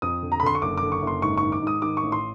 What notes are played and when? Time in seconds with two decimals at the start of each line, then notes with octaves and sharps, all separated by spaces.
0.02 F2 D#6
0.23 D3
0.32 A#5
0.40 B5
0.43 D3 C6
0.55 C#6
0.62 F#1 D6
0.77 D6
0.82 D3
0.92 C#6
1.02 F#1
1.07 C6
1.22 G#2 C#6
1.37 C#6
1.43 D#3
1.52 D6
1.62 G#2 D#6
1.82 D#3 D6
1.97 C#6
2.03 A1
2.12 C6